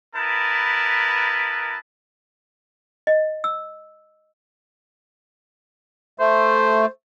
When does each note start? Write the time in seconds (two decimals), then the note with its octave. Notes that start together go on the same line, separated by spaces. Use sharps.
0.16 B3 E4 A#4 B4 A5
3.07 D#5
3.44 E6
6.20 A3 C5